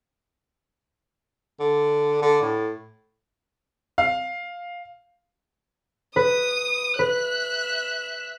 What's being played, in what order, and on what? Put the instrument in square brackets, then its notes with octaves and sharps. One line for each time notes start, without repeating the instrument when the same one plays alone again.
[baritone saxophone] D3
D3
A2
[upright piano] F5
[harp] B4 [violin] D#6
[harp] B4 [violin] E5 F#6